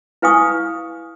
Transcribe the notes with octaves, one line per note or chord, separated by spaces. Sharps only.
E4 B4 F5 G#5 C#6 D#6